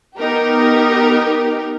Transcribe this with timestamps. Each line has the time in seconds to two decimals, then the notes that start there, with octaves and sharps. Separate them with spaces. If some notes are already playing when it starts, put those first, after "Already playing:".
0.18 B3 D#4 G4 A#4